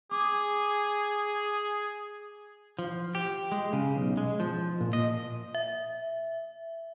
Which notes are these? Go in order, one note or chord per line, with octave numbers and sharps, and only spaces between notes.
G#4 D6
F3
G4
G#3
C#3
B1
G#3
F3
A#2
D#5
E5